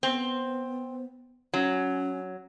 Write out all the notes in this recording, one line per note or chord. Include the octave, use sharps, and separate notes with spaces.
B3 C4
F#3 C#4